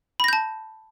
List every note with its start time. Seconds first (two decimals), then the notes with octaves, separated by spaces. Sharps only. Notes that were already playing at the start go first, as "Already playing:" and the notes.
0.20 B5
0.24 A#6
0.28 G6
0.33 A5